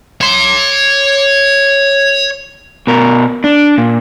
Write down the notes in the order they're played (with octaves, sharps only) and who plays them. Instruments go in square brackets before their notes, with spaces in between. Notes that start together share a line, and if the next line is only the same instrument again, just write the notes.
[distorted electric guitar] C#5 C6
[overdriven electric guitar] B2 A#4
D4
A#2